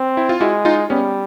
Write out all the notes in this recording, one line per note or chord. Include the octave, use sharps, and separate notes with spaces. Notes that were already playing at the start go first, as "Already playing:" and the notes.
Already playing: C4
E4
F4
G#3 E4 F#4
D#4 F4
G3 B3 C#4